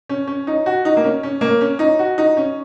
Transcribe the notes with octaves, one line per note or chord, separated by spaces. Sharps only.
C#4
C#4
D#4
F#4
D#4
A#3
C#4
C#4
A#3
C#4
D#4
F#4
D#4
C#4